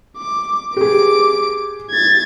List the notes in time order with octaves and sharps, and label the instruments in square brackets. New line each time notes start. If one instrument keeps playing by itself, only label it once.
[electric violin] D6
[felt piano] G4 G#4 [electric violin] D6 D7
[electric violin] G#6 A6